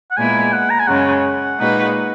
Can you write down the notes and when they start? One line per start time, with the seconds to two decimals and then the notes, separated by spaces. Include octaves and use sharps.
0.11 F#5
0.17 A#2 G#3 B3 E4 G#5
0.53 F#5
0.70 A#5
0.80 G#5
0.87 F#2 C#3 G#3 C#4 F#5
1.58 A#2 G#3 D#4 F#4 B4